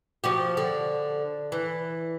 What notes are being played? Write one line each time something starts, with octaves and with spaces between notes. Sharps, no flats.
F3 F#4 G4
D3
E3